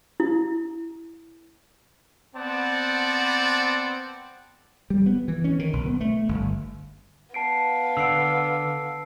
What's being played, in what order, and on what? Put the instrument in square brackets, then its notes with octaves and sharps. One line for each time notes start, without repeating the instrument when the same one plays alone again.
[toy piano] E4
[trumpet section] B3 C4 C5 D5 F#5 A5
[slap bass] G3
B3
E3
C#4
D#3
B1
B3
A3
G1
[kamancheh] B3 F5 [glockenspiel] A5 C7 D7
[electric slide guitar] D3 [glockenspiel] E6 C7 D7